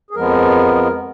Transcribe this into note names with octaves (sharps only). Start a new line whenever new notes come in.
G#4
F2 F3 G#3 B3 A#4